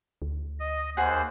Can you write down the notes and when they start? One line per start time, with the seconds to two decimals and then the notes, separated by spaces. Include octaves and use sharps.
0.22 D2
0.60 D#5
0.97 D#2 G#4 C5 F#5